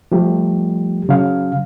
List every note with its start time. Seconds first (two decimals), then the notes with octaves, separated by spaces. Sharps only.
0.12 F3 G3 A3 G4
1.09 C#3 F#3 F5